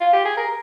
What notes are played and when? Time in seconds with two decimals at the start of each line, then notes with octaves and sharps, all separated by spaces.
0.01 F4
0.13 G4
0.25 G#4
0.37 A#4